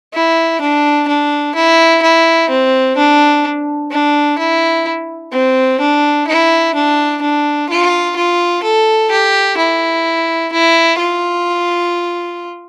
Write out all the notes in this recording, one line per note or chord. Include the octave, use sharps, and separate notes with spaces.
E4
D4
D4
E4
E4
C4
D4
D4
E4
C4
D4
E4
D4
D4
F4
F4
A4
G4
E4
E4
F4